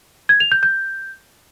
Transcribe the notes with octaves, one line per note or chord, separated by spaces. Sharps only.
G#6
F7
G6
G6